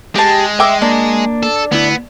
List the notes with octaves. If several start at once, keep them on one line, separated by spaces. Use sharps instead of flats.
G#3 G4 A5
E5 G5 D6
A#3 D4
A4
D2 B3 E4